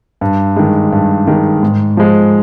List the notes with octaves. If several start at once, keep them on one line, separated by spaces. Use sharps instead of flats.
G2
D#3 G#3
G2
D#3 G#3
G#2
F3 G#3